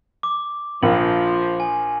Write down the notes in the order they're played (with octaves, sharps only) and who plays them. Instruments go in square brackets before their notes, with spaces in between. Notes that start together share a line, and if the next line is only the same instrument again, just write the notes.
[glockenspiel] D6
[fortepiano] A#1 [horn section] F3 [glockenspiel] F#7
[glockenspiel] G#5